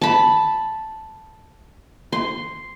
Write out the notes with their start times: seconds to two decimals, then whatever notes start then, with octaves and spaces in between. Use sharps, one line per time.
0.02 A5 B5
2.13 C6